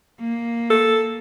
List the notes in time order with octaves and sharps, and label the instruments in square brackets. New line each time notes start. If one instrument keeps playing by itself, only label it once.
[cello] A#3
[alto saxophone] A4